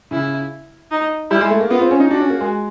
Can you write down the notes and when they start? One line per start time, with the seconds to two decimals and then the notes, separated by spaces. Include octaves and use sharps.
0.11 C#3 E4
0.91 D#4
1.30 G3 E4
1.41 G#3
1.51 A3
1.60 A#3
1.70 B3 F4
1.81 C4
1.91 C#4
2.00 D#4
2.10 D4 F#4
2.20 C#4
2.30 A#3
2.41 G#3